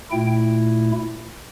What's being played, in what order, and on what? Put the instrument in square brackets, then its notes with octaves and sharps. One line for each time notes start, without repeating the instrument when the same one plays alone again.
[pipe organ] A#2 A3 E4 G5